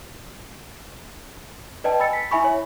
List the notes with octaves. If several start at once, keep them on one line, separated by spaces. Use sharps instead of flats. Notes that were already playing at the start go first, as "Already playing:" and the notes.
B4 D5 D#5 G5 A5
G#5 B5 E6 A6 C#7
B6
E4 E5 G#5 B5 C#6
C#5